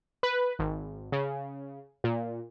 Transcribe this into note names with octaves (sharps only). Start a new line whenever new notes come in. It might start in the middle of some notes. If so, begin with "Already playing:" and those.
B4
G#1
C#3
A#2